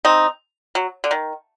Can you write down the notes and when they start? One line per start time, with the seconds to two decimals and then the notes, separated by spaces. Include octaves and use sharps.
0.05 C4 D#4
0.75 F#3
1.04 D3
1.11 D#3